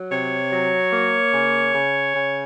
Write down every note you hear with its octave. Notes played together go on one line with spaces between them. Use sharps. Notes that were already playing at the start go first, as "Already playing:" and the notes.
Already playing: F#3
C3 C#5
F#3
A#3
C#3
C#3
C#3